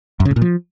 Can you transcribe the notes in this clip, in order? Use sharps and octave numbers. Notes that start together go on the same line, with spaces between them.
F#2
C#3
A2
A#2
F3